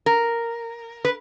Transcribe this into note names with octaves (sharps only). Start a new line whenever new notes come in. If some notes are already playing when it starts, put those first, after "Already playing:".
A#4
B4